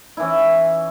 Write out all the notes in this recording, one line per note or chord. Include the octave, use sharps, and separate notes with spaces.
E3 C#4 E4